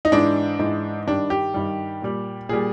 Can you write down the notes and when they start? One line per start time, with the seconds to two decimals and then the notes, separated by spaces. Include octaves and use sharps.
0.05 D#4
0.12 G#2 E3 G#3 D4
0.59 G#2 E3 G#3
1.07 G2 D#3 G3 D4
1.30 G4
1.54 G2 D#3 G3
2.02 A#2 G3
2.49 A#2 G3 G#4